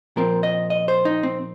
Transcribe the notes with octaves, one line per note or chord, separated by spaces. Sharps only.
A#2 F3 C4 A#4
D#5
D#5
C5
D#4
C4